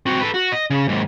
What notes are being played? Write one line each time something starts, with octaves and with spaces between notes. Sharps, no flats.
C4 F#4
A4 B4
F#4
D#5
C#3
D#2 G#2